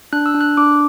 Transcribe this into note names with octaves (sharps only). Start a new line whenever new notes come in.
D4 F#6
E6
D4
F#6
D4 D6